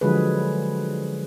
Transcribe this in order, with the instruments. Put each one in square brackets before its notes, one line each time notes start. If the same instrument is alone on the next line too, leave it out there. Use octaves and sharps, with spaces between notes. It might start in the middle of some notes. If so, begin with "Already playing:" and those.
[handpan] D3 F3 F#3 G#3 G#4 B4